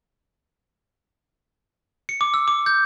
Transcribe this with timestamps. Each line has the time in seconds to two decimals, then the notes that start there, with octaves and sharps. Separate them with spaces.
2.09 C#7
2.21 D6
2.34 E6
2.48 D6
2.66 G6